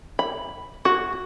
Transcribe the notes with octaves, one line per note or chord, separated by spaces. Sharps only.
B5
F#4